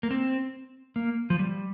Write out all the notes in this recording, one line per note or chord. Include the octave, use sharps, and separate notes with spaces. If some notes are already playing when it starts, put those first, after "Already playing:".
A#3
C4
A#3
F3
G3